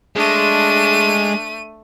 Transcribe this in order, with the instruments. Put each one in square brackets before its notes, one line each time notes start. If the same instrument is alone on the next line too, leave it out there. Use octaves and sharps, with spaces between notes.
[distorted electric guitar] G#3 [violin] A3 D#7 [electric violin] D4